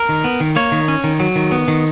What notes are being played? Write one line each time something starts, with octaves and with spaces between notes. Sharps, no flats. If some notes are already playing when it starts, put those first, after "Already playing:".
Already playing: A#4
D#3
B3
D#3
A#3 C#5
D#3
C#4
D#3
F#3
D#3
B3
D#3